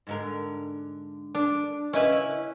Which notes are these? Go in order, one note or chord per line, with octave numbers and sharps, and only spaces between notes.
G#2 D3 A#4
D4
C#3 C#4 E4 B4 D#5